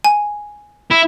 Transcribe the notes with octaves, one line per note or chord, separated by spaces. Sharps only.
G#5
E4